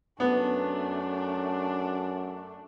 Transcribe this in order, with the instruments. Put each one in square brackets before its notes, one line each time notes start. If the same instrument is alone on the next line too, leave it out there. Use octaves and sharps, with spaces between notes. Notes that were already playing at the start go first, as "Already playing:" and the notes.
[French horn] F#2 [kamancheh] A3 D4 [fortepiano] B3